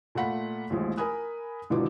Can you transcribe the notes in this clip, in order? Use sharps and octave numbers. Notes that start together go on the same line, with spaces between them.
A#2 A3 F4 F#5 B5 B6
A1 D#2 F3 G#3
A#4 G#5 B5 D#6 F#6
G#1 B2 D3 E3 F3 D6